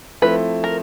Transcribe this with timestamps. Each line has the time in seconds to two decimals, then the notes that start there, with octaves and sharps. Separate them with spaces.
0.22 F3 A3 C4 E4 B4
0.64 A#4